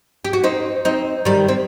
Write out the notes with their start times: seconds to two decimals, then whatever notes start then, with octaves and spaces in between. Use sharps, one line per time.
0.25 G4
0.33 F#4
0.44 C4 D#4
0.85 C4 D#4
1.25 D#3 G3
1.48 C4